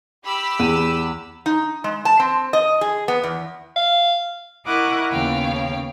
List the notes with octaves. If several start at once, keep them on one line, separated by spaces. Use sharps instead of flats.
G4 B5 E6
E2 D#7
D#4
G#3
A5
C4
D#5
G#4
B3
E2
F5
E4 A#4 D#5 F#5 C#6 D6
D#2 C#3 B3 C#5 F5 G5